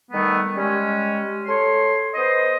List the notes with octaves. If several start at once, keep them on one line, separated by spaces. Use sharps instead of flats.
D#3 G3 A3 B3
G3 G#3 C#4
A4 C#5 C6
B3 C5 D#5